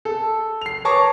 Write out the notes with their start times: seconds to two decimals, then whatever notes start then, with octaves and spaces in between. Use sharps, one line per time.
0.05 A4
0.61 C7 F7
0.85 B4 C#5 A5 A#5 C#6 D6